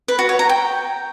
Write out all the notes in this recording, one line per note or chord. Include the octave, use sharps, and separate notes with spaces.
B4
F#4
C#5
A#5
G5